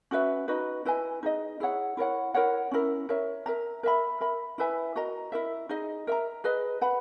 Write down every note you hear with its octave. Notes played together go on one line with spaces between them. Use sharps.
C#4 F#4 B4 E5
D#4 F#4 B4 D#5
E4 B4 D#5 G#5
D#4 G#4 D#5
E4 G#4 C#5 F#5
E4 A#4 C#5 F#5
E4 A#4 C#5 F#5
C#4 E4 A#4
A#4 C#5 E5
A#4 E5 A#5
A#4 E5 B5
A#4 E5 B5
E4 B4 E5 G#5
F#4 A#4 D#5 A#5
E4 A#4 E5
D#4 G#4 D#5
A#4 E5 A#5
G#4 B4 D#5
B4 F#5 B5